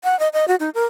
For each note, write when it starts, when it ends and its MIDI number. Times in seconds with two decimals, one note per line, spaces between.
0.04 0.18 78
0.19 0.28 75
0.33 0.45 75
0.48 0.55 66
0.60 0.70 63
0.74 0.85 70